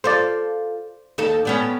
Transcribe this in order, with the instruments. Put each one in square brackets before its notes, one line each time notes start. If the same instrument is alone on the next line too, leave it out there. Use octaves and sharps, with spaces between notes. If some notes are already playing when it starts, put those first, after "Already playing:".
[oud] F4 A4 [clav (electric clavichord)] C5 D5
[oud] D#2 D#4 A4
G3 B3 C#4